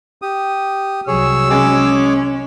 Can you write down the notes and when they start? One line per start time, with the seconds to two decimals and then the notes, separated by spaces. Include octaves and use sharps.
0.22 G4 D#6
1.07 C2 F#3 G#4 C#5 E6
1.50 G#3 C#4 G#4 D6